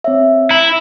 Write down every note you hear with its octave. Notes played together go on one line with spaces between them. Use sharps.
C4 C#5 E5
E4 A#5